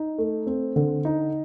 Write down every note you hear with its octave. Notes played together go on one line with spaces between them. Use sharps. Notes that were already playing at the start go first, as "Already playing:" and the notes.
Already playing: D#4
A3
C4
D3
D#4